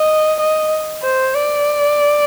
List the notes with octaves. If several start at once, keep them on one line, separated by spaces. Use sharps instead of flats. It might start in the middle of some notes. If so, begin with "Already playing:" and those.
Already playing: D#5
D#5
C5
D5